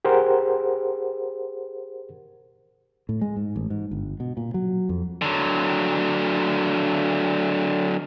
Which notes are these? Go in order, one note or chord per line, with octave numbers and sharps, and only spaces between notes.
G4 G#4 A#4 C5 F#5
A2
G#3
G#2
A1
G#2
G1
B2
A#2
F#3
F2
D3 F#3